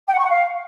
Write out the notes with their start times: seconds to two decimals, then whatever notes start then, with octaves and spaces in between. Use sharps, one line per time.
0.07 G5
0.13 F#5
0.18 C#6
0.24 F#5
0.29 F5